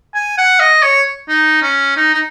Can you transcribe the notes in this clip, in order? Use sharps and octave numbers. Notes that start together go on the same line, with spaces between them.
G#5
F#5
D#5
C#5
D#4
C#4
D#4
D#4